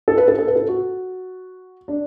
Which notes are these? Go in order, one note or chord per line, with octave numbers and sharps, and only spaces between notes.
A4
B4
A4
A4
B4
A4
F#4
D4